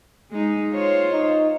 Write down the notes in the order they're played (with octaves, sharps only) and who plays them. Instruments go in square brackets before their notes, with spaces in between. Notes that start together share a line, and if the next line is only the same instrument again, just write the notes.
[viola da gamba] G#3 D#4
F4 C5 C#5
[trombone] D#4